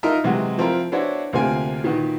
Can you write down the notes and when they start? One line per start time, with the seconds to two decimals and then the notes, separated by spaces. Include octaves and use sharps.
0.03 D#4 F4 A#4 D#5 E5
0.24 C3 E3 F#3 G#3 F#4
0.58 F3 C4 E4 F4 A#4
0.92 B3 D4 E4 F#4 C5 C#5
1.33 D2 C3 A#3 C4 F4 G#5
1.84 A#2 D#3 B3 F#4